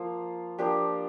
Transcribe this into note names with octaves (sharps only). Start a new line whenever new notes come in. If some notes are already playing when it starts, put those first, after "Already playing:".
Already playing: F3 A#3 F4 C5
F3 A#3 D4 G4